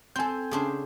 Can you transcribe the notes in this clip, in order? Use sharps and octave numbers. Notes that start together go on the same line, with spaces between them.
C4 A4 G#5 G6
C#3 D4 C5